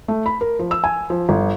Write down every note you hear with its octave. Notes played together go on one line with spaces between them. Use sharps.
A3
B5
A#4
F3
E6
G#5
F3
G1